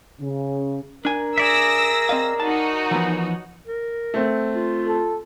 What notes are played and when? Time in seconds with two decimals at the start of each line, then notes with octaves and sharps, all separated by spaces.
0.20 C#3
1.05 D4 A#4 G#5
1.38 G#4 D5 E5 E6 A#6
2.09 C4 D#5 F5
2.40 D#4 F#4 C#5 A5
2.91 E3 F3 B3
3.67 A#4
4.14 A3 C4
4.55 F4
4.88 A4